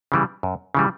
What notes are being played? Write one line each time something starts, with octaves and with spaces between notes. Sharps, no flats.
C#3 E3 G3
F#2
C#3 E3 G3